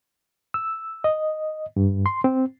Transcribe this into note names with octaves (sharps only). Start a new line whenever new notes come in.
E6
D#5
G2
C6
C4